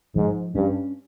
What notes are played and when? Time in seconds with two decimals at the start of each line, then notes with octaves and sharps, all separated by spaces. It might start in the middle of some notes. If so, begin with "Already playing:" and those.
0.15 G#2 F3
0.55 G2 C#4